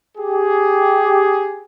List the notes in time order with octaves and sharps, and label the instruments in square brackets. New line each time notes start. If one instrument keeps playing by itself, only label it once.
[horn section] G4 G#4